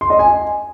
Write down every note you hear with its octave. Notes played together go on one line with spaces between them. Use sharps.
C6
D#5
G#5